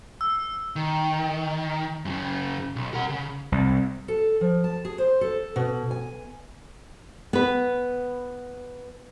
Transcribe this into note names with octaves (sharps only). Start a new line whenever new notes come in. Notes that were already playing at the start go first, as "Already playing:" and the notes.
E6
D#3
F#2 C#3
B1
A#4 F#5
C#3
C2
A4
F3
A5
G#4
C5
A4
B2
G#5
B3 B4